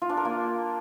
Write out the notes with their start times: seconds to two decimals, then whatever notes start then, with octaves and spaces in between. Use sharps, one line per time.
0.02 F4
0.09 D4
0.17 A#4
0.25 A#3